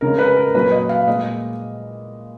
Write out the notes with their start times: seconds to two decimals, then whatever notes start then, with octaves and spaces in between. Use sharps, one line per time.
0.01 C#3 G#3 A#4
0.19 B4
0.37 A#4
0.54 A#2 F#3 B4
0.71 D#5
0.89 F5
1.07 A#2 G#3 D#5